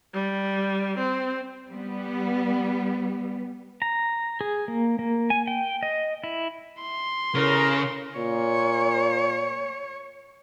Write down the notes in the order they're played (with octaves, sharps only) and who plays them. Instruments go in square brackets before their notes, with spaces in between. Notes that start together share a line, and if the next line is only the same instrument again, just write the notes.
[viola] G3
C4
[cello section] G3 B3
[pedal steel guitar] A#5
G#4
A#3
A#3
G#5
G5
D#5
E4
[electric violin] C6
[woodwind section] E2 A2 A#4 [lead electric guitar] C#3
[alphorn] A#2 [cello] C#5